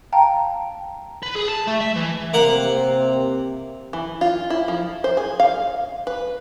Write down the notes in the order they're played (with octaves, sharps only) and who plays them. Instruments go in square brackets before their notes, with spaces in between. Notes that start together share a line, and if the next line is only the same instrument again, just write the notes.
[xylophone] F5 G5 A5 A#5
[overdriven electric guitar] B4
G#4
A5
A3
E5
E3
[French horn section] C3 [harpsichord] A#3 F#5
[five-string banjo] E3
F4
E4
F3
C5
G#4
F5
B4